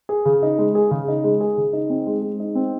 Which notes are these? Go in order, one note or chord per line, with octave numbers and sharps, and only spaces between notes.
G#4
C#3
D#4
G#3
G#4
C#3
D#4
G#3
G#4
C#3
D#4
C4
G#3
G#3
D#4
C4